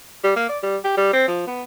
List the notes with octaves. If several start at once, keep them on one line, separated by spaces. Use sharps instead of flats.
G3
A#3
D5
G3
G4
G3
C4
F3
B3